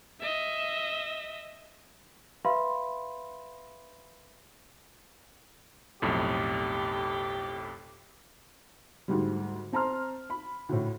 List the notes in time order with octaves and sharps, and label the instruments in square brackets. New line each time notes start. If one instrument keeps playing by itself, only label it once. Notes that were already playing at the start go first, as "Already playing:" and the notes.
[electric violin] D#5 E5
[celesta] B4 E5 F5 B5 C6
[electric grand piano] B1 F2 A2 [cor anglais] G4
[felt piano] D2 G#2 G3
C4 A5 A#5 C6 F6
B5
D2 A2